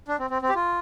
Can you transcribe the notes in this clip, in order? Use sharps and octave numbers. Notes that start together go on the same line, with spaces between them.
D4
C4
C4
C4
G4
F4